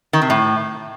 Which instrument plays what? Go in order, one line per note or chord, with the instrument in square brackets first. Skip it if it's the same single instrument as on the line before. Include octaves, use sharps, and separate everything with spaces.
[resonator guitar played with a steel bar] D#3
C3
A2